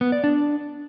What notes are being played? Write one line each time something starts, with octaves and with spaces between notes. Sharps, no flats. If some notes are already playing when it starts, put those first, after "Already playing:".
B3
D5
D4